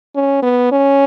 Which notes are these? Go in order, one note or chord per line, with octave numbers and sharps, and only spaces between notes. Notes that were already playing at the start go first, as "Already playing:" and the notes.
C#4
B3
C#4